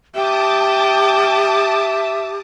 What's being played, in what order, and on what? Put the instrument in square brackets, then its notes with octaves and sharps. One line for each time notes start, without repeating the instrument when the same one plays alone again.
[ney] G4 [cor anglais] E5 [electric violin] G5 [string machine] A5 D6 D#6